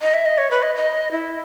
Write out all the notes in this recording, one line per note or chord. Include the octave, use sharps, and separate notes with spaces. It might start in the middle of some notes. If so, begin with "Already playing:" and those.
D#5
E5
D#5
C#5
B4
D#5
D#5
E4